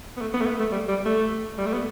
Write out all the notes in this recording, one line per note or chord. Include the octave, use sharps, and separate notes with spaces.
B3
A3
B3
A3
B3
A3
G3
G3
A3
G3
A3
B3